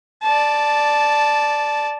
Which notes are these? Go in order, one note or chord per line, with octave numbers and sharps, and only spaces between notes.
D5 A5